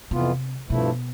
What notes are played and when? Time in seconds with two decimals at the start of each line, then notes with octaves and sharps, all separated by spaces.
0.11 F2 C3 E3 B3 F4
0.70 G2 B2 F3 A3 E4